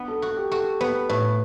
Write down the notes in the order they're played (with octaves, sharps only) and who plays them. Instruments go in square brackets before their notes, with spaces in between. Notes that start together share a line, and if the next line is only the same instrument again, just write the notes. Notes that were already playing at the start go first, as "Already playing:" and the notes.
Already playing: [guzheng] B3 D4
[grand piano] A4
[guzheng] F#4 [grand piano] A4
[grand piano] G4
[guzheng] F#4 [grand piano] A4
[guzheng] B3 [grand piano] B4
[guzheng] A2 [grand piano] B4